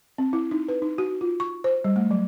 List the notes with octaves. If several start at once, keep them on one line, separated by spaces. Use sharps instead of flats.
C4
E4
D#4
B4
D#4
F#4
F4
C#6
C5
G3
A3
F#3